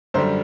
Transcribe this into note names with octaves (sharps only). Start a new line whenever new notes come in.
F#2 D3 G3 C5